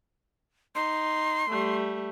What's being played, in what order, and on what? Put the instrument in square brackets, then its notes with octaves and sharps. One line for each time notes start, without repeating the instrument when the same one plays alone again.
[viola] D#4 [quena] C6
[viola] G3 A3